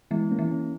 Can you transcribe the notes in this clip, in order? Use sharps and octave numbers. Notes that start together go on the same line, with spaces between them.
E3 G#3 B3
A#3 C#4
E3
A#3 C#4